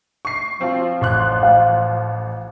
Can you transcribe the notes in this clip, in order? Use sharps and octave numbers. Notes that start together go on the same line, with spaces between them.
C#6 C7
F3 C4 F4
A1 C6 F#6
F5